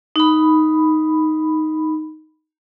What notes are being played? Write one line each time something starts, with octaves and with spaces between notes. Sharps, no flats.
D#4 B5